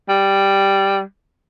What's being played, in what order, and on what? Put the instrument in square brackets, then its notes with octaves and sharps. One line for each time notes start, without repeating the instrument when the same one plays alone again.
[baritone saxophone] G3